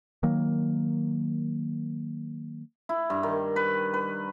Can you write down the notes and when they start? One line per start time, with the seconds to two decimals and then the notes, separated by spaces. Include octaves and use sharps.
0.23 D#3 F#3 A#3
2.89 E4
3.10 G2
3.23 D#3
3.56 B4
3.94 B4